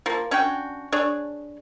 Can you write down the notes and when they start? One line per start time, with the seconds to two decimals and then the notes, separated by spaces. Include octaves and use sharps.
0.06 F3 A#3
0.31 C#4 D4 F#4 G5
0.92 D4 G#4 C#5